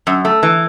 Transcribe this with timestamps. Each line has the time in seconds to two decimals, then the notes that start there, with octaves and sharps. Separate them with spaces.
0.07 F#2
0.25 A3
0.43 E3